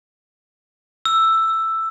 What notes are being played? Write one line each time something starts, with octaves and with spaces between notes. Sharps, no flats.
E6